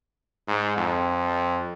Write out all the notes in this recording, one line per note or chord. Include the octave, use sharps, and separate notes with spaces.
G#2
F2